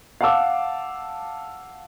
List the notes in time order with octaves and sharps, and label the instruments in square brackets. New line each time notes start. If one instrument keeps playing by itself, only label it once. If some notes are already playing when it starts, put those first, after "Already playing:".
[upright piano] F5 F#5 A5 D6 E6